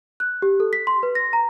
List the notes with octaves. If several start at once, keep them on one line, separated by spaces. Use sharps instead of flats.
F#6
G4
A4
B6
C6
B4
A#6
A#5